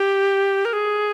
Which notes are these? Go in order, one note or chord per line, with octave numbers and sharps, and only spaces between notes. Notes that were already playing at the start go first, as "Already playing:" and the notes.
Already playing: G4
A#4
G#4